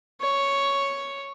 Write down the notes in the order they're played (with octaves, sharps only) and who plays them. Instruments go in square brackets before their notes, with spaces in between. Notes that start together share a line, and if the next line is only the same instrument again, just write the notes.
[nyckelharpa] C#5